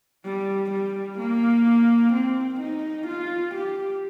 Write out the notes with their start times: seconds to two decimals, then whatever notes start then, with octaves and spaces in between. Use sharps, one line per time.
0.24 G3
0.71 G3
1.18 A#3
2.13 C4
2.60 D#4
3.07 F4
3.54 G4